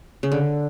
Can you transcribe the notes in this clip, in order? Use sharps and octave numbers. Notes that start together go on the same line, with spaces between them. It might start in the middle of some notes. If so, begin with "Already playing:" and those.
C#3
D3